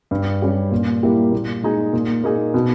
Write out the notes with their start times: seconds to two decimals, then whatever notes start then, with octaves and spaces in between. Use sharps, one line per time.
0.11 G2
0.42 G3 C#4 G4
0.72 A#2
1.03 G3 A#3 E4 G4
1.32 A#2
1.63 G#3 D#4 G#4
1.93 A#2
2.24 A#3 D#4 G#4
2.54 B2